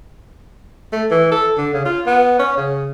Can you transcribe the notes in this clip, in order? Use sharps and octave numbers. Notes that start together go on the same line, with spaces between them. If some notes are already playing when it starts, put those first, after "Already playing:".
A3
E3
A4
D3
C#3
F4
B3
C#4
C#3